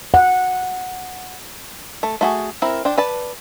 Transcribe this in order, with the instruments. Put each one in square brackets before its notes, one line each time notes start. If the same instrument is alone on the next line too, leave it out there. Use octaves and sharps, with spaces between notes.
[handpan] F#5
[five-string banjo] A3
A3 F#4 G#4
C4 E4 A#4
D4 C5 G5
B4 D5 A5